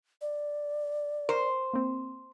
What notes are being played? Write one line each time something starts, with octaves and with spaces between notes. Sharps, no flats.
D5
A#4 C5
A#3 C4